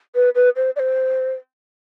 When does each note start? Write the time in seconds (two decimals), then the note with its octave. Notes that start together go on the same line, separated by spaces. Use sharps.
0.15 B4
0.35 B4
0.56 C5
0.76 D5
0.79 C5